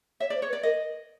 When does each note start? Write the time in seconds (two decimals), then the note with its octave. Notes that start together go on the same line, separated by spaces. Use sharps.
0.20 C#5 E5
0.30 D5
0.35 C5
0.42 C#5
0.48 B4
0.53 D5
0.63 A#4 D#5